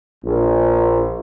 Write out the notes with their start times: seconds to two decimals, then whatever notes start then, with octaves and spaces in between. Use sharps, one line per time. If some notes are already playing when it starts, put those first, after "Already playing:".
0.24 A#1